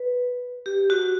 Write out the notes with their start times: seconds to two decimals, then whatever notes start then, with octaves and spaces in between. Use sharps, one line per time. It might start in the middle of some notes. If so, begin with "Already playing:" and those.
Already playing: B4
0.66 G4
0.90 F#4